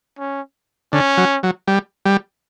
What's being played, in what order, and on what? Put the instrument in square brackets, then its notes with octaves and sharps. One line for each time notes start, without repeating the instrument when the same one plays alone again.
[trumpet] C#4
[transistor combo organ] D3 [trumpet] C#4
[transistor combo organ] F#3
F#3
G3
G3